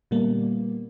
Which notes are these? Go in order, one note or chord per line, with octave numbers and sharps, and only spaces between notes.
A#2 D3 G3 A#3 B3